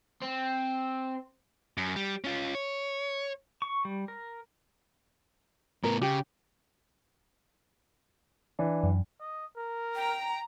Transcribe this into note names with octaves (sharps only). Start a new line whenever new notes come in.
C4
F#2
G3
C#4 F4
C#5
C#6
G3
A#4
A2 B3 A#4
C#3 G4
E3 D4
F#2
D#5
A#4
G5 A#5